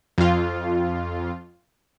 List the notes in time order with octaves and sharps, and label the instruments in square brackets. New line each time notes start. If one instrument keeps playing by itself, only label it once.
[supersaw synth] F2 F4